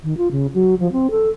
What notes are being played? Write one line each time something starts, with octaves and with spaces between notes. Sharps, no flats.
D#3
F4
C#3
F#3
F3
C4
A4